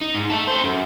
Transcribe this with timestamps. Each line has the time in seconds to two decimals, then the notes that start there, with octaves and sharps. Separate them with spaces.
0.02 D#4
0.15 G#2
0.30 A4 E5
0.48 A4 C5
0.64 F#2